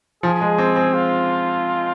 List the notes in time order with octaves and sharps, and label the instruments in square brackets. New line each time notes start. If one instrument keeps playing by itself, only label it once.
[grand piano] F3 [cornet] G#4
[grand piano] G#3
C4
C4
[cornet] F4